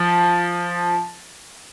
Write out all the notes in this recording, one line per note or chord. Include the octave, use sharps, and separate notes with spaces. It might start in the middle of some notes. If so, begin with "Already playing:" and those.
Already playing: F3